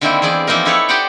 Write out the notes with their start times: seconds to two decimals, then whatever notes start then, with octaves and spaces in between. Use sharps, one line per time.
0.01 D3 D#3 A#3 C4 E4 G5
0.22 E2 E4 G#4 D5 G5
0.47 E3 F3 A#3 C4 D#4 A#4
0.65 D#4 E4 A4 B4 C#5 D5
0.89 G4 C5 D5 D#5 F#5 G5